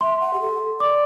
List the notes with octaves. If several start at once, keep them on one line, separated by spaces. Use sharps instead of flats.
E5 C6
F#5
G4
A4
D5 D6